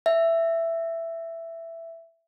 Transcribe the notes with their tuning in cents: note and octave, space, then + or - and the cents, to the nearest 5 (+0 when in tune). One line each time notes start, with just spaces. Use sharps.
E5 +10